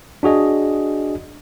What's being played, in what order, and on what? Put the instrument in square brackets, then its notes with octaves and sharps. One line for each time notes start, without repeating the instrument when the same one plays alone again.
[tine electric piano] D4 F#4 G#4 D#5